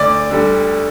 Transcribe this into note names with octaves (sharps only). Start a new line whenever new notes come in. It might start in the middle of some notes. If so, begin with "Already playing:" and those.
Already playing: D2 D5
D3 G3